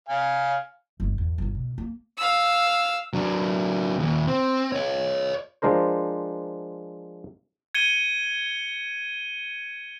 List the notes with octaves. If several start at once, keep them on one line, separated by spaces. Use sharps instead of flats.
F5 G#5
G1 D2
E2
G1 G2
B2
A#3
F5 E6
F#3 D4
D#2 A#2
C4
C#5 D#5
F3 G#3 D4 A#4 C5
G#6 C#7 D#7 G7